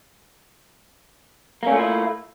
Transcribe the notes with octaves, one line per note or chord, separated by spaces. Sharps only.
A3 A#3 C#4 E4 F4